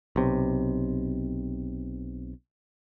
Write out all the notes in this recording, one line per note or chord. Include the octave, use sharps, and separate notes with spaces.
B1 C3